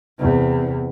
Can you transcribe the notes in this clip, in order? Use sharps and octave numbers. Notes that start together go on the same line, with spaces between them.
E2 C3